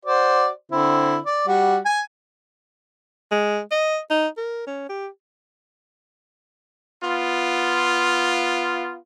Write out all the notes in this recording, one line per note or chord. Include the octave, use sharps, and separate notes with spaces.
F#4 C5 D5
D3 C4 E4
D5
G3 F#4
G#5
G#3
D#5
D#4
A#4
C#4
G4
B3 F4